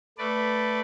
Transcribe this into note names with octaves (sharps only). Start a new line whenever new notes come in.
A3 B4 D5